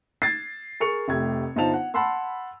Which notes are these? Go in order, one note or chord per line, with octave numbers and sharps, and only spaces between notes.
G#6 A6 C7
G#4 A#4 C#6 C#7 F7
F1 A3 G4 G#6
G1 D#4 F4 C5 A5 F7
F#5
F#5 A5 B5 C6 E6